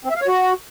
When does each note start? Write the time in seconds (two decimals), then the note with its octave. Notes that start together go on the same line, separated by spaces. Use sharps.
0.05 C4
0.10 E5
0.16 F5
0.22 C#5
0.27 F#4